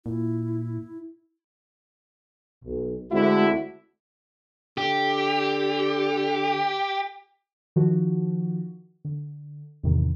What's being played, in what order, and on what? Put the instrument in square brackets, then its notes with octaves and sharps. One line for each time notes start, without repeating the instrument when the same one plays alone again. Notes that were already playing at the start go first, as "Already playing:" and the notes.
[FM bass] A#2 [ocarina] E4
[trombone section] B1
[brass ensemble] D2 D3 E4 [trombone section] G#3 C4 F#4
[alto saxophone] D3 [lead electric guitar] G4
[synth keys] D#3 F3 F#4
D3
E2 A2 C3 D#3